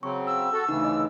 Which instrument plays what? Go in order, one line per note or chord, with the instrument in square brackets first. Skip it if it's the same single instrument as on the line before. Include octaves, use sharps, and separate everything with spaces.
[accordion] C#3 F#3 C4 [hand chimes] C#6
[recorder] E6
[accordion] F#4 A4
[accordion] D2 C#3 E3 [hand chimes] D#4
[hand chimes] D#5